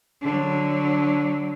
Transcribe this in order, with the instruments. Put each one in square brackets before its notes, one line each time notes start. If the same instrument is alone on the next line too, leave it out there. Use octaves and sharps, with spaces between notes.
[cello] D3 F#3